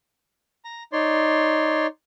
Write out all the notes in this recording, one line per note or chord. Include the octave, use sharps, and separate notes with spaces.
A#5
D#4 C#5 D5 C6